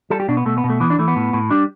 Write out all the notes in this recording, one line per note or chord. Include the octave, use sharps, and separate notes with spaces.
G3 A4
G4
B2 D4
B3
B2 A3
B3
B2
A3
E3 B3
D4
E3 A3
B3
A2
A2
G3 D4